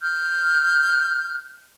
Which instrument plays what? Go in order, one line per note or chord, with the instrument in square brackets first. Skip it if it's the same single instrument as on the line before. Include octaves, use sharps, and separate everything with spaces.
[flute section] F6 G6